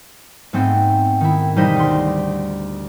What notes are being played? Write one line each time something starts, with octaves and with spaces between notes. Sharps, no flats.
G#2 A3 B3 C4
D#3 E4
E1 G3 D#4 C5 D#5 B6
D2 C6